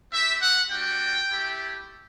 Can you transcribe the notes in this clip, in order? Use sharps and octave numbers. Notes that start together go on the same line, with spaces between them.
C4 G4 E5
F#5
G3 D4 F#4 G5
A3 E4 G4